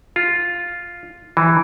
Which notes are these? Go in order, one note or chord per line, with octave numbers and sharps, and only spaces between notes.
F4
E3